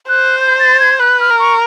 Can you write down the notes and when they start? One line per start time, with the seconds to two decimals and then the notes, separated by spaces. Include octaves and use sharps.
0.09 C5 F#6
0.40 G6
0.59 A6
0.80 G#6
0.99 B4 F#6
1.20 F6
1.30 A#4
1.40 C#6